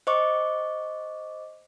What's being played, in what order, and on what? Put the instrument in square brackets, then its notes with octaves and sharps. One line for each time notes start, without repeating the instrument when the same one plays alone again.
[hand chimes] C5 D#5 C#6 D6